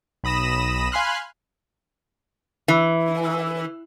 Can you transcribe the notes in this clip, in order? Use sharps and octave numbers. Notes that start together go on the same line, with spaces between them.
B1 B5 D#6 A#6 E7
F5 G#5 B5 C6 F6 F#6
E3